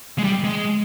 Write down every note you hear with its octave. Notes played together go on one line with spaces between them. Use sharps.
G#3
G3
G#3